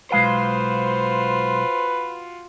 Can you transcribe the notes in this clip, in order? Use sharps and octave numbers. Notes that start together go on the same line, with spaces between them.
B1 G#3 F4 F#4 B4 C5 F5